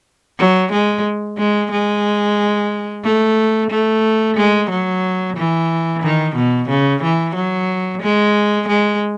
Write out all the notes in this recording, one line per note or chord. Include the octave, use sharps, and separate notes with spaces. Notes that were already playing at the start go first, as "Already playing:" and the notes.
F#3
G#3
G#3
G#3
A3
A3
G#3
F#3
E3
D#3
B2
C#3
E3
F#3
G#3
G#3